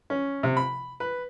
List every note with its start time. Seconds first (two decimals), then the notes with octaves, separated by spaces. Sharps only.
0.10 C#4
0.43 C3
0.57 B5
1.00 B4